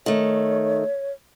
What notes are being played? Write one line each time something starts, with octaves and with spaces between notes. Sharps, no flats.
D#3 A3 C#5